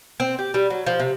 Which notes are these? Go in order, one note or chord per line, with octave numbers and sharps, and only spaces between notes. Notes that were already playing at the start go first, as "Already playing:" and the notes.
C4
G4
G3
F#3
F3
C3